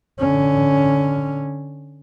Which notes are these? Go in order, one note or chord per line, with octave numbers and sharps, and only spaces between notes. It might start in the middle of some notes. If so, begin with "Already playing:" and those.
D3 C#4